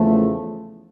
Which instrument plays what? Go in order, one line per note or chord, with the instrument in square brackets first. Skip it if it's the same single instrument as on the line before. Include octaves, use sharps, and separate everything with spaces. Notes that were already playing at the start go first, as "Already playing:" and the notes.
Already playing: [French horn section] E2 C#3 F3 A3